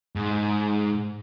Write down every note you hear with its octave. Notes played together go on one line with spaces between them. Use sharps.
G#2